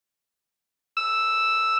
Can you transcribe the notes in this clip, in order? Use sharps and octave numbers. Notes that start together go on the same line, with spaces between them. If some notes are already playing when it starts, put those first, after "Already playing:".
E6